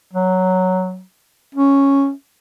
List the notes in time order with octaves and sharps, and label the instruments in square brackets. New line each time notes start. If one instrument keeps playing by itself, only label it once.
[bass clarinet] F#3
C#4